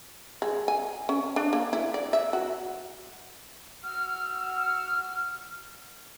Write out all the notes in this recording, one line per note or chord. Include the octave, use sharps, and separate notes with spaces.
G#3
G#5
C#4
D4
A#3
E4
D5
E5
F#4
F#4 F#5 E6 F6